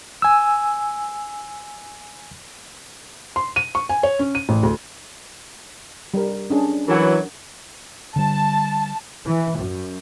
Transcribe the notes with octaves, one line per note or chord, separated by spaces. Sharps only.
G#5 E6
C6
D#7
C#6
G#5
C#5
C#4
D#7
A1
D2
G3 A#4
C#4 D4 G#4
E3 F#3 A#4 F#5
D3 G3 A5
E3
F#2